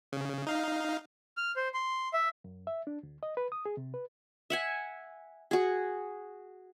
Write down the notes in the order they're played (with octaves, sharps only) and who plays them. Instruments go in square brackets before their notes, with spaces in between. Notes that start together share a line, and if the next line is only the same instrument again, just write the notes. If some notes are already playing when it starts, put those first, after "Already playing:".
[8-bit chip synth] C#3
D#4 F5
[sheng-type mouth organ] F6
C5
C6
E5
[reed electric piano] F#2
E5
D4
D2
D#5
B4
D#6
G#4
C3
B4
[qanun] E5 F#5 G#5
F#4 G#4